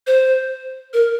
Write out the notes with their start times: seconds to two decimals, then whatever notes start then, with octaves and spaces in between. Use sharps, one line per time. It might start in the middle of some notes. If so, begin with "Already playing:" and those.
0.07 C5
0.93 A#4